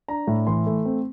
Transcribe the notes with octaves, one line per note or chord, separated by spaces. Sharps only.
D4 A#5
A2
E3 C6
A3
C4